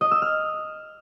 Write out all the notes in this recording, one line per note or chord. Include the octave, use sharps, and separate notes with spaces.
D#5
E6
F6